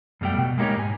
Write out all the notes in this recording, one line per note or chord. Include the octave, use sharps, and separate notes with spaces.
F#2 B2 G3 A3 G5
B2
G#3 A#3 D#4 G4 C#5
G#2 G#5